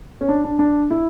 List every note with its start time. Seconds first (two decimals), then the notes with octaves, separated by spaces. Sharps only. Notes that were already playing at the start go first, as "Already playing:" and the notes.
0.21 C#4
0.29 D4
0.44 D4
0.59 D4
0.90 E4